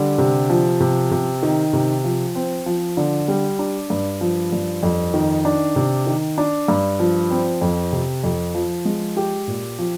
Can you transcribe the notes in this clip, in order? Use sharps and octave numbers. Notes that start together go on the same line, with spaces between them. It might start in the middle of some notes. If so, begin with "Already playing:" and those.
Already playing: D3 G3
C3
F3
C3
C3
D#3
C3
F3
C4
F3
D3
G3
D4
G2
F3
G2
F2
D#3
D4
C3
D#3
D4
G2
F3
C4
F2
C3
F2
F3
G#3
G4
A#2
F3